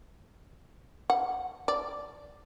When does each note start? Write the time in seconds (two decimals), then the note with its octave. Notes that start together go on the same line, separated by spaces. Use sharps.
1.10 F#5
1.68 D5